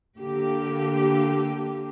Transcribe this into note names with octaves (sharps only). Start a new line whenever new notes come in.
D3 A#3 G4